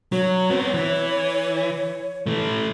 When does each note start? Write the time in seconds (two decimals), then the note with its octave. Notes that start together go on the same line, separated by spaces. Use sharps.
0.12 F#3 C#5
0.50 B3 C4
0.74 E3
2.26 E3 A3